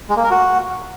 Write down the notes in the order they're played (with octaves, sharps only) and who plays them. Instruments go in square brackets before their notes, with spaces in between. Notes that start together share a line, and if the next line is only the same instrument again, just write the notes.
[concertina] G#3
A#3
A#4
F#4